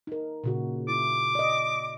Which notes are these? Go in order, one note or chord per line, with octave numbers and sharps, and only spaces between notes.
D#4 A#4
A#2 C#3 F#4
E4 D6
D5 D#5